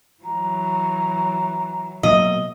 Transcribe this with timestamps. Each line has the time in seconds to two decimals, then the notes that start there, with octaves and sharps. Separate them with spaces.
0.23 E3 F#3 A#5
2.03 B2 F#3 A#3 D#5